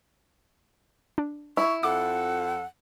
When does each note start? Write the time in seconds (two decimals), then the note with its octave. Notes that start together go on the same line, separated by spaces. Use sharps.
1.18 D4
1.57 E4 C#6
1.83 F2 A4 F#5 D6